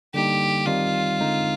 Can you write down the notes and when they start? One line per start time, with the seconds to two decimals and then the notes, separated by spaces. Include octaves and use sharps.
0.14 D3 G3 A#3 D#4 G4
0.66 D#3 G3 C4 D#4 F4
1.20 D3 G#3 C4 D#4